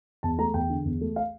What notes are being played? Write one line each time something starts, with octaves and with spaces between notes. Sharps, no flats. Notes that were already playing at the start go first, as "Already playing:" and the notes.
E2 A5
A3 A#5
E2 G5
D3
E2
A3
F5